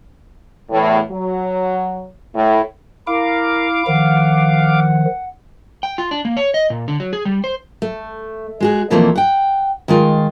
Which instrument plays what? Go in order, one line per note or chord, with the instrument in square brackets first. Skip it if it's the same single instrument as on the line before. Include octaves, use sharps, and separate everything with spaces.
[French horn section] E2 A2
F#3
A2
[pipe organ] E4 [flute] A#4 [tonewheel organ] F5 D6
[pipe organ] D#3 F3 [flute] F#5
[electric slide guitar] G5
F4
D4
A#3
C#5
D#5
A#2
D3
F#3
G#4
G3
C5
[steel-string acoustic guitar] A3
G#3 F#4 G#4
B2 E3 F3 A3 A#3 C4
F#5 G5
D#3 G#3 F4